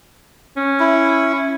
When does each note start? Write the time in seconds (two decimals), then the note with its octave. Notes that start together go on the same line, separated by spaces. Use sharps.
0.56 C#4
0.80 E4